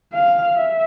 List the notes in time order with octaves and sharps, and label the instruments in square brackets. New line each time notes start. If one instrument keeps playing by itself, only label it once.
[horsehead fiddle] F5
E5